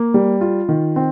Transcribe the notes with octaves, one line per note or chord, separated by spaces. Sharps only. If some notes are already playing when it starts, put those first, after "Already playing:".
Already playing: A#3
G3
F4
D#3
C4